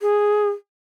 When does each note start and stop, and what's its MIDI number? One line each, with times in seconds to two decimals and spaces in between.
0.02 0.49 68